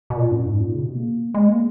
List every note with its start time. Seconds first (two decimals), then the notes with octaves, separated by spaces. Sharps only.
0.10 B2
0.16 A#2
0.31 F#2
0.46 G#2
0.60 A#2
0.75 C#3
0.85 B2
0.95 A#3
1.34 G#3
1.48 A#3